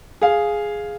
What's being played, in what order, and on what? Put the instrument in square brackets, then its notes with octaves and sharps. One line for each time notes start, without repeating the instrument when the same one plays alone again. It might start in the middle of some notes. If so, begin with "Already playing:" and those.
[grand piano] G#4 F5